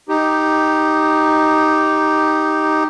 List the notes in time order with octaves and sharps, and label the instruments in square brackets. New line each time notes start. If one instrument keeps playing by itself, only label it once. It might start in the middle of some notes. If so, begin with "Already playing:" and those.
[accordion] D#4 G4